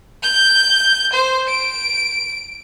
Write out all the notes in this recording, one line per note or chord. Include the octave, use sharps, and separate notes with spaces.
G6
C5
D7